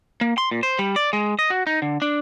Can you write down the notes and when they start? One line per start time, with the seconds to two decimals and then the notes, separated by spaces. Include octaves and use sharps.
0.21 A#3
0.38 C6
0.51 A#2
0.63 C5
0.79 G3
0.96 D5
1.13 G#3
1.39 D#5
1.50 F#4
1.67 D#4
1.82 D3
2.02 D4